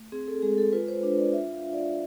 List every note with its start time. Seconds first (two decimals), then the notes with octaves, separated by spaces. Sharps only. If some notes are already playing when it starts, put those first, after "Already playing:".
Already playing: A3
0.12 C4 G#4
0.28 A4
0.42 G#3 G#4
0.58 A4
0.73 F4 B4
0.88 C5
1.03 D4 C5
1.18 D5
1.33 F4 E5
1.53 F5
1.64 D4
1.73 D5